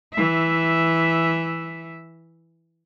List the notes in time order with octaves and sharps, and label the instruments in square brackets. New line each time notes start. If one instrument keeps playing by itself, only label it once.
[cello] E3 E5